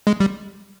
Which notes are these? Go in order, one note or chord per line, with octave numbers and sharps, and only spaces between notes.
G#3
G3